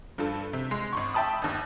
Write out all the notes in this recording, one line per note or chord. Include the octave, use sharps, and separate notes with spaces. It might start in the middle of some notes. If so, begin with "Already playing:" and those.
G2 F3 A4
C3
G#3
G#1 C6 C#6
E5 G5 A5 B5 D#6
G1 D#2